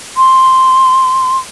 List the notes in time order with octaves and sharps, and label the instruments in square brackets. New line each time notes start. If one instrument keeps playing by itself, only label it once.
[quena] C6